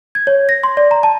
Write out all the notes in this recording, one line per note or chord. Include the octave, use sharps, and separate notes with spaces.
G#6
C#5
A#6
C6
D5
A#5
A5